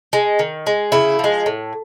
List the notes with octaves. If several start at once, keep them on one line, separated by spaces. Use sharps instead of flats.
G#3
D#3
G#3
C#3 E4
F3 G#3
A2